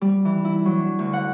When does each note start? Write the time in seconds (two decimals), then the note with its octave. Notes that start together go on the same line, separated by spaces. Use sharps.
0.01 G3
0.25 E3
0.45 E4
0.65 F#3
0.80 D4
0.99 D2
1.13 F#5